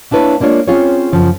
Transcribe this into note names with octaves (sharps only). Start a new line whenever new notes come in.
A#3 D4 E4 B4 C#5
G#3 A#3 D4 F4 C#5
C4 C#4 F4 G#4 C#5
F#2 C#3 F3